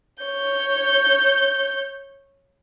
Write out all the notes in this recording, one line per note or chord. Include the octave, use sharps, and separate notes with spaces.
C#5 G6